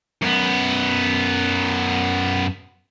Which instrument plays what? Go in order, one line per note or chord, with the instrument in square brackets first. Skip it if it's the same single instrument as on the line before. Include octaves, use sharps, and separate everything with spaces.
[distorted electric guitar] F#2 B3